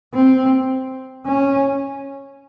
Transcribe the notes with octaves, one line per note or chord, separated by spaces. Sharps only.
C4
C#4